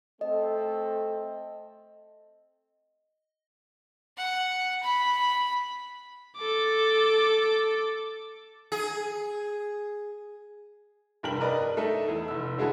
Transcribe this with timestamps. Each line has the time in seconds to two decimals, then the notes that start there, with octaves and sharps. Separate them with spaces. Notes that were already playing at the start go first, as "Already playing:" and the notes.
0.21 A3 C4 A4 D#5
4.17 F#5
4.83 B5
6.37 A4 D6
8.72 G#4
11.23 F1 G2 A#4 G5 F#7
11.41 A#4 B4 D5 D#5
11.77 A3 D#4 A4 E5
12.08 E2
12.28 F1 E6
12.58 D3 G#3 E4 F#4 G#4 A4